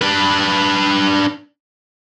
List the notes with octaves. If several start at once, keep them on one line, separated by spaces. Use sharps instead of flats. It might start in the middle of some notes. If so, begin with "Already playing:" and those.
D4 B4